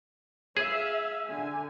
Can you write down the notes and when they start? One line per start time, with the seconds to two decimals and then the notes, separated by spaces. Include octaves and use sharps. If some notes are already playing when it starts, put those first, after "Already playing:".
0.57 G#4 E5 F5
1.26 D3 G#5